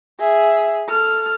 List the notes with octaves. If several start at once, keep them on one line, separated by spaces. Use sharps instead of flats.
G#4 E5
A4 F6